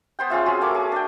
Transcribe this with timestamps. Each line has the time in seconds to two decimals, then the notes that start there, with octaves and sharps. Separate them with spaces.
0.19 B3 C5 G5
0.30 G#3 C#4 F4 E5
0.46 C4 F#4 G#4
0.61 A3 A#3 C#5 D6
0.74 G#4
0.92 D4 G5